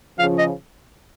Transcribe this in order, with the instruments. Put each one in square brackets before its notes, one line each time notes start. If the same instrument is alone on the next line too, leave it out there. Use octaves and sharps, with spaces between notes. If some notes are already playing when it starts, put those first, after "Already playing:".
[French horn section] C#3 F3 [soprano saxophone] F5
[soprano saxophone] D#5